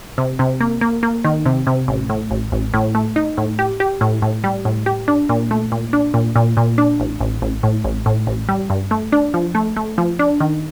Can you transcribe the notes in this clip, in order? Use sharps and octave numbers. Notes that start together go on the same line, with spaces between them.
C3
C3
A#3
A#3
A#3
D#3
C3
C3
A1
A2
A1
A1
A2
A3
D#4
A2
G4
G4
A2
A2
G3
A2
G4
D4
A#2
A3
A#2
D4
A#2
A#2
A#2
D4
A1
A1
A1
A2
A1
A2
A1
G3
G2
A3
D4
F3
A3
A3
F3
D4
D#3